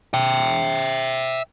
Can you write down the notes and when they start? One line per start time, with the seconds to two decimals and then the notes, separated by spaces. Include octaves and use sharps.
0.14 E5 G5